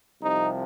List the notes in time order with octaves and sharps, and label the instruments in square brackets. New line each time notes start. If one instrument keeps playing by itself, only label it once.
[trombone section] C2 C3 F3 D#4